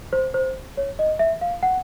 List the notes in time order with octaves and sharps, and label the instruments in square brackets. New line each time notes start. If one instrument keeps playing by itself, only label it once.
[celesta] C5
C5
C#5
D#5
E5
F5
F#5